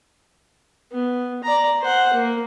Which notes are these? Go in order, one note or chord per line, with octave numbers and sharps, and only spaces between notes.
B3
D5 A#5
C5 F#5
A#3